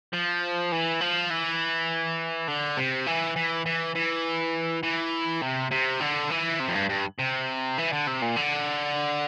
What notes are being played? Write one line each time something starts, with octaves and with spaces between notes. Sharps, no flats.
F3
E3
F3
E3
D3
C3
E3
E3
E3
E3
E3
C3
C3
D3
E3
C3
F2
G2
G2
C3
E3
D3
C3
A#2
D3